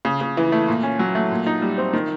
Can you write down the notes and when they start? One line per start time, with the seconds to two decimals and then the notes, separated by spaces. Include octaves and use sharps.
0.05 C#3
0.21 C#3
0.37 E3
0.52 A3
0.68 A#2
0.83 C#4
0.99 F#3
1.15 A3
1.31 A#2
1.46 D#4
1.62 G3
1.78 C4
1.93 D#3